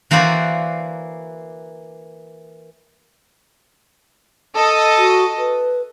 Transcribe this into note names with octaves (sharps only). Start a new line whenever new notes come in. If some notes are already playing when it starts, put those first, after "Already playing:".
E3 A#3 F#4 C5 D5
A4 D#5
F#4
B4